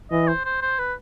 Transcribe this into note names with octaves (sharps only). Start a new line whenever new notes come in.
E3 D#5
C5
C5
C5
B4